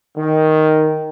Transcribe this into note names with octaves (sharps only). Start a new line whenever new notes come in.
D#3